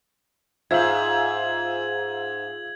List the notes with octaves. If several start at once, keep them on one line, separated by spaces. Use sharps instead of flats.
G#2 F4 C5 E5 G#6 F#7